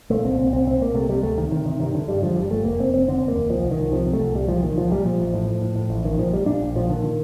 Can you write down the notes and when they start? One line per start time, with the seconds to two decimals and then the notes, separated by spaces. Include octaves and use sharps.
0.10 A#2 A3
0.25 C2 C4
0.39 C2 C4
0.53 C2 C4
0.66 A#2 C4
0.81 C2 A#3
0.95 C3 A3
1.09 C3 G3
1.23 D2 A3
1.37 C3 D#3
1.52 C3 D#3
1.66 C3 D#3
1.80 G2 D#3
1.95 D3
2.08 G2 G3
2.22 D3 F3
2.36 G1 G3
2.50 G1 A3
2.64 F1 A#3
2.79 F1 C4
2.93 F1 C4
3.08 D3 C4
3.21 F1
3.28 A#3
3.35 D#2
3.50 C2 F3
3.64 C2
3.71 D#3
3.78 C2
3.92 C3 F3
4.06 C3
4.13 A3
4.20 C2
4.35 A#2 G3
4.49 C2 F3
4.63 A#2 D#3
4.77 C2 F3
4.91 A#2 G3
5.05 A#2 F3
5.20 A1
5.34 A2
5.47 A2
5.62 A2
5.76 A2
5.90 A1
6.05 A#1 D#3
6.18 A#2 F3
6.32 A#2 G3
6.46 A#2 D4
6.61 A#1
6.75 A#2 F3
6.89 D3 D#3
7.03 D3